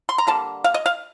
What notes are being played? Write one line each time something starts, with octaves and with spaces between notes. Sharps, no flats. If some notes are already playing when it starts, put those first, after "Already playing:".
C6
A#5
D3 G3 A#3 A5
F5
D#5
F5